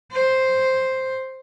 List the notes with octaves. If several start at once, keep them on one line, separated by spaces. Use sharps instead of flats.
C5